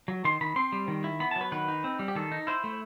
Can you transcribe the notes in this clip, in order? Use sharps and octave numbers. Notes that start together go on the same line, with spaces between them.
F#3
D#3 C6
D#3 B5
C4 C6
G3
D#3
E4
B3 B5
A5
F#3
B4
D#3 B4
D#4
C4
G3
G4
D#3 A4
D#4
E4 C5
A3